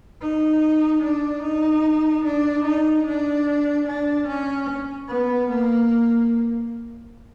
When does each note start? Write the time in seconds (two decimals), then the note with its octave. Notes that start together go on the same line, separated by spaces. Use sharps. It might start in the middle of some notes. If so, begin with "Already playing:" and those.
0.22 D#4
1.03 D4
1.43 D#4
2.25 D4
2.65 D#4
3.06 D4
3.87 D4
4.27 C#4
5.09 B3
5.50 A#3